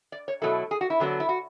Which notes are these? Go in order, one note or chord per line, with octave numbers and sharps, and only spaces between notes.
D5
C#5
B2 F#3 A3 E4 A4
G#4
F#4
E4
D3 F#3 B3 D4
E4
F#4